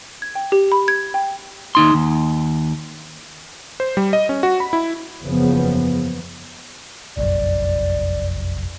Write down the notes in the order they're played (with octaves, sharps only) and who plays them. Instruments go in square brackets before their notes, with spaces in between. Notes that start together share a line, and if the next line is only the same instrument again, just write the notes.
[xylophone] G#6
G5
G4
B5
G#6
G5
[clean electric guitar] D#2 D#4 C6
D#2
[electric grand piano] C5
G3
D#5
C#4
F#4
B5
E4
[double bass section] F#1 E2 C#3 F3 B3
[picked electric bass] F1 A#1 F#2 [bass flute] D5